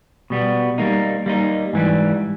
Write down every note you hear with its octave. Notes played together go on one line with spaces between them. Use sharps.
B2 G3 B3
G3 A#3 D#4
G3 A#3 D#4
G#2 E3 G3